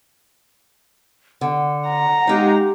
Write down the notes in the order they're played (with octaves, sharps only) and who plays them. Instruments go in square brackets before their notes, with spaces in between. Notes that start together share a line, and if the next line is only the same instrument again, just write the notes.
[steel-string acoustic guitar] D3 [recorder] F#5
[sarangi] A#5
[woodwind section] G#3 C#4 D#4 [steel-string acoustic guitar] G4 F5